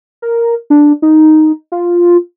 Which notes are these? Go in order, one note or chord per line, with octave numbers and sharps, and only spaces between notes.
A#4
D4
D#4
F4